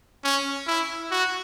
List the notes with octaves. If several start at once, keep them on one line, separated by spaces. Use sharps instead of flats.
C#4
E4
F#4